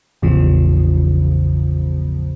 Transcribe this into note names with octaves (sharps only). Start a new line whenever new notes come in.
A1 E2 C#3 F3